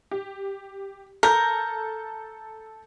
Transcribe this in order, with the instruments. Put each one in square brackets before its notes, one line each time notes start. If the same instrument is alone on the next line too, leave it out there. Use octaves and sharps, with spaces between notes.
[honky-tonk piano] G4
[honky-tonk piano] A4 G6 [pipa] A#4